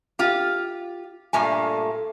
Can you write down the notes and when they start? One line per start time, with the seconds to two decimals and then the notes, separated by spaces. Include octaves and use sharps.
0.19 F4 G4
1.33 G2 A#2 A3 G#5